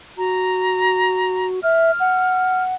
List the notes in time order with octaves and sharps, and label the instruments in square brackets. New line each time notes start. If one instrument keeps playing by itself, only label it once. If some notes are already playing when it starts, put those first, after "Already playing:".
[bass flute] F#4 [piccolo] A#5
[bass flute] E5 [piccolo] F6
[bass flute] F#5